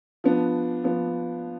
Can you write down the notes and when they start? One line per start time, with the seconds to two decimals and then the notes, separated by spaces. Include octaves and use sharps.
0.24 F3 B3 D4
0.84 F3 B3